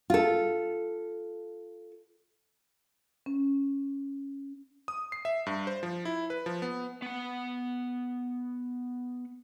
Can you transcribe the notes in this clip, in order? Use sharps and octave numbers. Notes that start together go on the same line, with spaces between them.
F4 A4
C#4
D#6
C7
E5
G2
C5
F3
E4
B4
F3
B3
B3 F#5